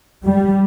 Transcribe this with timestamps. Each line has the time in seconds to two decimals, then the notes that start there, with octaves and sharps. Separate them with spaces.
0.25 G3